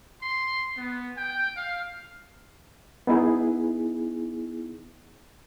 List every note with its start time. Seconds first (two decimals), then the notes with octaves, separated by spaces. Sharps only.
0.22 C6
0.77 B3
1.17 G5
1.57 F5
3.07 B3 D#4 E4 G#4